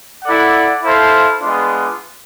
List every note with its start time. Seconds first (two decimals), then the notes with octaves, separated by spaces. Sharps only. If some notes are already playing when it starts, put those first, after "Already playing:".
0.24 E4 A4 D5 F#5
0.83 E4 A4 C5 F5
1.41 G#3 B3 D4 F4